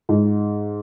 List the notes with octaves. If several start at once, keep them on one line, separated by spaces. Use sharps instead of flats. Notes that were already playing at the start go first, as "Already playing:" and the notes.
G#2